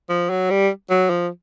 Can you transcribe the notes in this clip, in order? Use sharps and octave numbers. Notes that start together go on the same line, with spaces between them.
F3
F#3
G3
F#3
F3